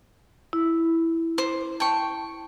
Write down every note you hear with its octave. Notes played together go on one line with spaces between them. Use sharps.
E4
C5
G5 A5 C#6